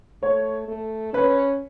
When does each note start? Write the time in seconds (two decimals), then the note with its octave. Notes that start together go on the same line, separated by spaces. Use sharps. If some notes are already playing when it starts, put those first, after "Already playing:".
0.23 A3 C#5
0.68 A3
1.13 C#4 B4